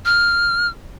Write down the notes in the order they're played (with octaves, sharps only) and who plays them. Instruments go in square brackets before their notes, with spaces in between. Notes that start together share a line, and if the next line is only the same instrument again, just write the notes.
[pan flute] F6